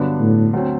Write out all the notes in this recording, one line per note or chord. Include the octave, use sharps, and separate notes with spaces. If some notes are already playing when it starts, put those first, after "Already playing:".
Already playing: G2 D3 F#3 B3 D4
A2
D2 D3 F#3 C4